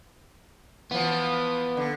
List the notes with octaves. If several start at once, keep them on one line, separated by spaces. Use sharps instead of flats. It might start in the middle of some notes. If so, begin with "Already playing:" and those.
E3 F3 B3
D3